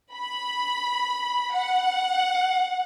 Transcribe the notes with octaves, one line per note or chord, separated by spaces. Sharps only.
B5
F#5